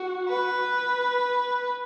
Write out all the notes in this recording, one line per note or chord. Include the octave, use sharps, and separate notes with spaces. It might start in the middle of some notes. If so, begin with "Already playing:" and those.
Already playing: F#4
B4